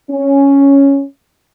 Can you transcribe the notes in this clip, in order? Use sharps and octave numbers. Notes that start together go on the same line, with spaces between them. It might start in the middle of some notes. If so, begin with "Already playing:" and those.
C#4